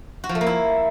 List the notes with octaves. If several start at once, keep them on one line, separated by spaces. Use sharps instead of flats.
F#4
F3
A3
A#3
E4